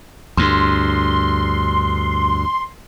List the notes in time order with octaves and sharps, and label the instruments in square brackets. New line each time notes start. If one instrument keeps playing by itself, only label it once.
[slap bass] D2 G2 [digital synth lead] C6